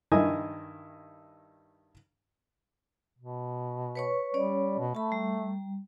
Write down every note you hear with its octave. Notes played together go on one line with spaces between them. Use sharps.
G2 D#3 E4 D#5 G#5 D#6
B2
B4 C#5 C#6
G3 C#4 C#5 D5
B2
A3 A5 B5
G3